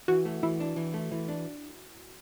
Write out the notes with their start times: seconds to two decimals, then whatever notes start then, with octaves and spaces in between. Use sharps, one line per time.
0.08 E3 F#4
0.25 A3
0.43 E3 E4
0.60 D4
0.76 E3
0.94 A3
1.11 E3
1.28 D4